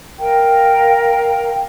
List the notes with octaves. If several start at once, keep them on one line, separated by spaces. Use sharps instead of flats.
A#4 F5 G5 A#5